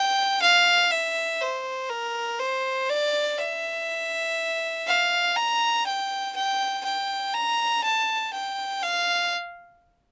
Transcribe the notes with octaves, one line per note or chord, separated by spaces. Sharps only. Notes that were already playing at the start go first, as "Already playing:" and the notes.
Already playing: G5
F5
E5
C5
A#4
C5
D5
E5
F5
A#5
G5
G5
G5
A#5
A5
G5
F5